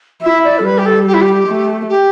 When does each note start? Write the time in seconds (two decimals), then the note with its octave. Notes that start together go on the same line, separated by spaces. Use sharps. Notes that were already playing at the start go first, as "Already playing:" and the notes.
0.23 E4 E5
0.44 D5
0.57 A4
0.64 G3 B4
0.78 G4
0.85 A4
1.06 G4
1.13 E4
1.21 G4
1.47 A3
1.89 G4